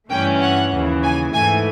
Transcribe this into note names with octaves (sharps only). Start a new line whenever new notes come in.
G2 E3 A3 C#4 G5
F#5
D#2 C#3 E3
G#5
G#2 E3 A3 G#5